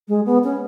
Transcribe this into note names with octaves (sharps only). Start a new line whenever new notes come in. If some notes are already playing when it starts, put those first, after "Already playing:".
G#3
B3
C#4